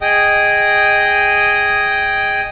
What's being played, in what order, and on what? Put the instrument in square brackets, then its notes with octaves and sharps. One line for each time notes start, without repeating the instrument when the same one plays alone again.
[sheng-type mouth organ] G#4 D#5 G5 D#6